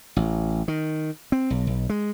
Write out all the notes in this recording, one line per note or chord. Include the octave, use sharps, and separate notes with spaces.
A1
D#3
C4
B1
B1
G#3